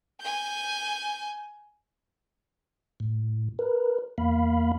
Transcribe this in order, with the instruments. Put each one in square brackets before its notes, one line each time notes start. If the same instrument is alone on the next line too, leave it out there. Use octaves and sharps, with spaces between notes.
[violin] G#5 G6
[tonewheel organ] A2
A#4 B4
E2 A#3 F5 B5